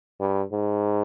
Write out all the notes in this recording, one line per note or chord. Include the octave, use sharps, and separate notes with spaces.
G2
G#2